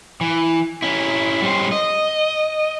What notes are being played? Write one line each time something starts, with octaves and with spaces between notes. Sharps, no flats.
E3
C#4 E4
G3 G#3 B3 C#4 C5
D#5